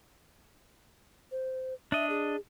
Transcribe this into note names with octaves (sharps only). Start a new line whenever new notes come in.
C5
D4 D#5 E5
G#4